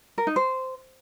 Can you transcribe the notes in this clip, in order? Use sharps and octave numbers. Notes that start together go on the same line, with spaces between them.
A#4
D#4
C5